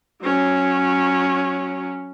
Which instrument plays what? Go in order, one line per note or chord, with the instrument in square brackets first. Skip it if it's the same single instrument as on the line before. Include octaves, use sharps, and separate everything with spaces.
[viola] F#3 C#4